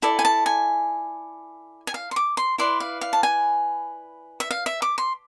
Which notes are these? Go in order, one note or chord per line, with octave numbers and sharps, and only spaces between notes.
E4 A4 D5
G#5
A5
G#5
G#5
F5
C6
D6
C6
E4 B4 D5 C6
F5
F5
A5
G#5
E5
F5
E5
D6
C6